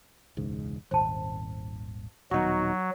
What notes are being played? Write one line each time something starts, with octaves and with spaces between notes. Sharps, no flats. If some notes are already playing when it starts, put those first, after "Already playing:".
E1 C#2 G#2
D#1 G#1 C5 A5
D#1 B2 F#3 D#4 F#4